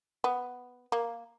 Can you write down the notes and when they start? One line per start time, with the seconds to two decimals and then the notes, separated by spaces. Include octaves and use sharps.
0.24 B3
0.92 A#3